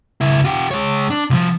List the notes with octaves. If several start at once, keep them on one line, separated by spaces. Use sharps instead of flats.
C#2 E4
F4 G4
G#3 C#5
D4
C2 F3